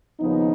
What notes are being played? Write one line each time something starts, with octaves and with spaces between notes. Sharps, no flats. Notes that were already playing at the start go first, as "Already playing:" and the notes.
D#2 C#3 F3 B3 D#4